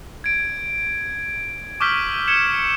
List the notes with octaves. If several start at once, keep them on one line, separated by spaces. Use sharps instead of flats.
G#6 D7
C#6 D6 E6 F6 G6 B6
G#6 C#7 E7 G7